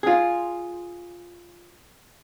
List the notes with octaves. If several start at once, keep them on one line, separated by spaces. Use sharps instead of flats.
F4 G#4